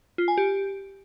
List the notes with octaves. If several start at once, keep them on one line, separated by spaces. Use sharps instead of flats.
F4
G#5
G4